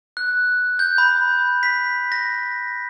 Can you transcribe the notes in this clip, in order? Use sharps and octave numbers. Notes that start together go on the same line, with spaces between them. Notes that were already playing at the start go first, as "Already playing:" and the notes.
F#6
G6
B5
B6
A#6